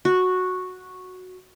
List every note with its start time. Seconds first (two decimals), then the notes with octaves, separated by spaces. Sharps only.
0.05 F#4